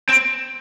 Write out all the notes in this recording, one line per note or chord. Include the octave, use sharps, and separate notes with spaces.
C4